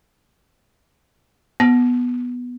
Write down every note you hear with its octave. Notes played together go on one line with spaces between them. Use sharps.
B3